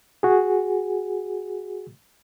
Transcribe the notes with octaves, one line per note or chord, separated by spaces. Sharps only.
F#4 G#4